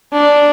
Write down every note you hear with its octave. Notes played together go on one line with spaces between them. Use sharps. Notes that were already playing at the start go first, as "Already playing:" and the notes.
D4